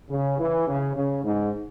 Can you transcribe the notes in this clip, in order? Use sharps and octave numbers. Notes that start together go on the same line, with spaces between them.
C#3
E3
C#3
C#3
G#2